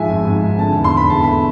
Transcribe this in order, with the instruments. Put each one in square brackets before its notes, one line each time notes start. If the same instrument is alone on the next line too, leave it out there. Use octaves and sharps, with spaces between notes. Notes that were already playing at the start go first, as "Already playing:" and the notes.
Already playing: [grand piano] G#2 F3 G#3 E5 G#5
G#1
G#2
G#1
D3 A5
E2
C6
E2 B5
E2 A5
A3 B5